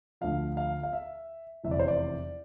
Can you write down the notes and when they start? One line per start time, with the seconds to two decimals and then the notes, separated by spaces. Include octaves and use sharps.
0.21 D2 D3 F3 F5
0.57 F5
0.83 F5
0.93 E5
1.63 F1 E2 C3 E3 E5
1.71 D5
1.79 C5
1.88 D5